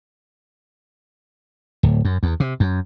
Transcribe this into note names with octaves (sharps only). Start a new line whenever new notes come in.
D1
F#2
E2
C3
F#2